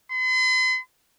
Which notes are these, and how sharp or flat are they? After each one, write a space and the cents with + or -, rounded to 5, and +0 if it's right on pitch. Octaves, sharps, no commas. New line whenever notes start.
C6 -45